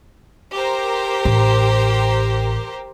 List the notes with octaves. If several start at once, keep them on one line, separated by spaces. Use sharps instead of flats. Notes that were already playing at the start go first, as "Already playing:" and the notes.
G4 A#4 C5
A1